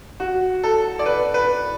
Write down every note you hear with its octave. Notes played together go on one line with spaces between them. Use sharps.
F#4
A4
D5
B4
B4